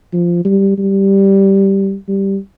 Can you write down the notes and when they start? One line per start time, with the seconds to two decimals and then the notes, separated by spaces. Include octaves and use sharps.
0.13 F3
0.45 G3
0.78 G3
2.08 G3